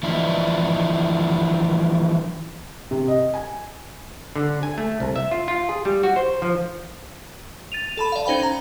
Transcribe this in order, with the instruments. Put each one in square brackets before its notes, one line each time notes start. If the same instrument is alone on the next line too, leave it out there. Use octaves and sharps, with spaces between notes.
[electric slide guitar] E3 F3 D4 E4
[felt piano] C3
D#5
G#5
[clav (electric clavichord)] D3
G#5
A3
C2
E5
F4
F4
G#4
G3
F#4
C5
F3
[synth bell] A6 D#7 F7
A4 A5 B5
D5 F5
C#4 D#4 C5 G5 B5
A#5